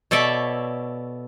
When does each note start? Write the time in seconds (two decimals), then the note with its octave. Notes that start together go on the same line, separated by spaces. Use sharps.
0.11 B2 A4 C#5 D5 E5